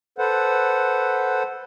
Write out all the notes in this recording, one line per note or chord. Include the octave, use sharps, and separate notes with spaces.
A4 B4 C5 F#5